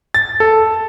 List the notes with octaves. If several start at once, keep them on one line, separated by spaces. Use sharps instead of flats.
A6
A4